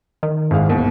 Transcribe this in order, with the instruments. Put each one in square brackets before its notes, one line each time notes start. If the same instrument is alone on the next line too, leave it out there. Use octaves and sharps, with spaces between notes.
[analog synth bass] D#3
[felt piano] G#1 [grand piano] E4 G#4 F5
[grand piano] G1 D#2 B2